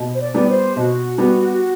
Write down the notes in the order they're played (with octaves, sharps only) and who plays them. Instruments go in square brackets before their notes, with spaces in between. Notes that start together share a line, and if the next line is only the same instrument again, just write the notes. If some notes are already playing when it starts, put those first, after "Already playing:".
Already playing: [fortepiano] B2
[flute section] C5
D5
[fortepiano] G3 B3
[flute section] C5
[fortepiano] B2 [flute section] F#4
[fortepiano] G3 B3